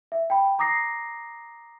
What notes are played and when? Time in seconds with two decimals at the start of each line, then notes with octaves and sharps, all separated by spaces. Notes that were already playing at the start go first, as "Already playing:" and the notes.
0.12 E5
0.30 G5 B5
0.59 A#5 D6 D#6 A#6 C7